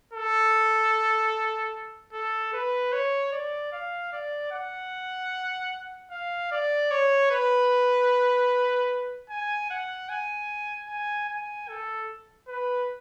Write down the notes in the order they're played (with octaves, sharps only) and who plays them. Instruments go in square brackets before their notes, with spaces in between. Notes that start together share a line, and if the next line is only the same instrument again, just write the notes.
[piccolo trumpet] A4
A4
B4
C#5
D5
F5
D5
F#5
F5
D5
C#5
B4
G#5
F#5
G#5
G#5
G#5
A4
B4